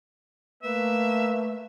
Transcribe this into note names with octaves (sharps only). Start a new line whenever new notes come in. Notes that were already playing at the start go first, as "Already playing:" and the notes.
A3 A#3 B4 E5